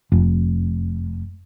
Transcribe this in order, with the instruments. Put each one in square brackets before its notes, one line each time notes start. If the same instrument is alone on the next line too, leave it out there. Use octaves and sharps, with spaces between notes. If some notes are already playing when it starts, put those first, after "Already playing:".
[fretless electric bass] F1